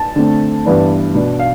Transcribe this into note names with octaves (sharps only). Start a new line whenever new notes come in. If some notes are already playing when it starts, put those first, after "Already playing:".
Already playing: A5
D3 A3 C4
G2 E3 B3 D4
B2 B3 D4
F5